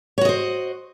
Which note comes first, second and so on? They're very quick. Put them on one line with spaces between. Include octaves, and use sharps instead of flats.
C#5 F#4 D#5 C5